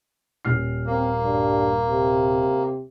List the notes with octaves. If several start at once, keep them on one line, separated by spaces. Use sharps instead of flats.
D#1 F6 C7
A#3 C4
G2
C3